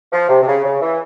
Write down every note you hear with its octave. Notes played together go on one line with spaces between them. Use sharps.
F3
C3
C3
C#3
C#3
E3